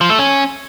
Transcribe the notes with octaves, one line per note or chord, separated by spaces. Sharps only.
F3
A3
C#4